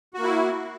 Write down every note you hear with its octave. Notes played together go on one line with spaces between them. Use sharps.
A#3 E4 F#4